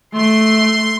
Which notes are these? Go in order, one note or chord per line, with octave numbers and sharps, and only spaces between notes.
A3 C6